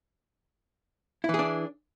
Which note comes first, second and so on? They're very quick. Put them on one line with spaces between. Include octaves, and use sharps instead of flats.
E4 E3 G#4 D4